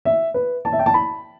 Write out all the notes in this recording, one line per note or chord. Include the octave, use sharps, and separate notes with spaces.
E5
B4
A5
E5
G5
A5
B5